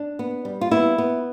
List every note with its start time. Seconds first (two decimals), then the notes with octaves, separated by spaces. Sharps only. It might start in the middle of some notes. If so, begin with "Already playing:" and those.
Already playing: D4
0.19 B3
0.45 G3
0.61 F4
0.71 B3 E4
0.98 B3